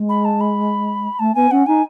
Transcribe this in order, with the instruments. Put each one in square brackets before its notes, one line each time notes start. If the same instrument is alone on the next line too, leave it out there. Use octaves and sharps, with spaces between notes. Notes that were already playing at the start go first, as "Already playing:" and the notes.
Already playing: [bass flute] G#3
[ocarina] B5
A5
B5
[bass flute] A3 [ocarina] A5
[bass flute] B3 [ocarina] G#5
[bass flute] C#4 [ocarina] F#5
[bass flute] D#4 [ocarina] G#5